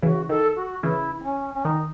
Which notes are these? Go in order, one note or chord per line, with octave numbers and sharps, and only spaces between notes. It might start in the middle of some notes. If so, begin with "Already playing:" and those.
C#3 E3 F#4
D#3 A4
F#4
C#3 E3 E4
C4
C#4
C#4
D#3 D#4